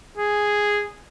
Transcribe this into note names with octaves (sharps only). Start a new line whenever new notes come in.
G#4